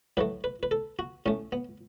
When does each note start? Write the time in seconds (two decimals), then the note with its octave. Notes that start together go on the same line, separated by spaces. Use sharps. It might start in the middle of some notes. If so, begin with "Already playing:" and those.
0.17 A2 F#3 A3 B4
0.44 B4
0.63 B4
0.71 A4
0.99 F#4
1.26 A2 A3 C#4
1.52 B3